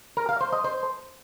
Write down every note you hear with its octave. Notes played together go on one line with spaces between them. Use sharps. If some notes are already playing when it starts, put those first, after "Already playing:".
A#4
F5
C5
D#5
C5